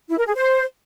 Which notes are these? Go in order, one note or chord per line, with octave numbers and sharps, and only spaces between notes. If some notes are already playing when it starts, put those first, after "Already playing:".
E4
A#4
G#4
C5